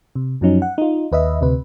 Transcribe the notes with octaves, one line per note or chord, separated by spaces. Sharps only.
C3
F#2 F3 F#3 C#4 D#4
F#5
D#4 F4
D#2 B4 D#5 E5
D2 C3 B4